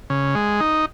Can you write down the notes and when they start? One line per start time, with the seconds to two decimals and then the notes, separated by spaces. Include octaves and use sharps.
0.10 C#3
0.35 G#3
0.60 D#4